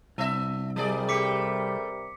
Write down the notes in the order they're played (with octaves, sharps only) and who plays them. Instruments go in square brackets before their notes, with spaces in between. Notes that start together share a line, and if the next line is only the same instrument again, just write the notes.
[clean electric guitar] C2 [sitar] B3 E5
[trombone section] C3 G3 A#4 [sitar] F#3 G#4 D5
[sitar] A3 G4 [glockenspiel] D6 B6 C#7